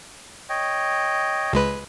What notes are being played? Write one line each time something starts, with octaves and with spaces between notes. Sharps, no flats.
C#5 D#5 G5
C#2 G#3 B4